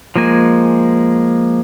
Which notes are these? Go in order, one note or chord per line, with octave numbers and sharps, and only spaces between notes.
F3 G#3 A#3 G#5